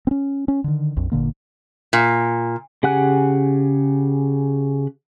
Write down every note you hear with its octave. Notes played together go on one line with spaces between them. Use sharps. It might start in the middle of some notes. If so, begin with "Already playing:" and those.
C4 C#4
C#4
D3 D#3
A#1 F2
G1 A#2 D3 A#3
A#2
C#3 G4 F#5 G#5 F#6